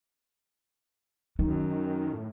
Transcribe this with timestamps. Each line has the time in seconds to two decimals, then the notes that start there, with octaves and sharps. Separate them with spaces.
1.39 F#2 D#3 F#3
2.13 A2